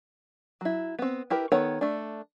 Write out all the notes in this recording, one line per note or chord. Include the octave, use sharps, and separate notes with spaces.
F#3 E4
B3 C4
E4 G4 A#4 B4
D#3 B3 A4 C#5 F#5
A3 D4